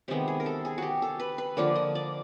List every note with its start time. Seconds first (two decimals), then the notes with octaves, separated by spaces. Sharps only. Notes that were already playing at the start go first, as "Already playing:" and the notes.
0.08 C3 D#3 G#3 B3 G4
0.28 G#4
0.40 A#4
0.46 A4
0.65 G#4
0.78 F#4 G4
1.02 A4
1.20 B4
1.38 B4
1.57 D3 F3 A#3 D5
1.75 D#5
1.95 D5